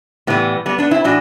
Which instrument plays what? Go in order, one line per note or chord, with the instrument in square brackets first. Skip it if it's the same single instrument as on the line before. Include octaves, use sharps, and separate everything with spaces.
[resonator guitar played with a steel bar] A2 E3 G3 B3
G3 B3
B3 D4
C4 E4
A2 E3 D4 F#4